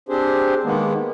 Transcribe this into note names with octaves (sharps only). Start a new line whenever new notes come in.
C4 D4 G4 G#4 C5
D#3 G#3 A#3 B3